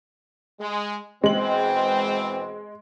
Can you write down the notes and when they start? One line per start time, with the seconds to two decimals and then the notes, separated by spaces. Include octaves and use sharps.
0.61 G#3
1.24 B2 E3 G#3 C4 F#7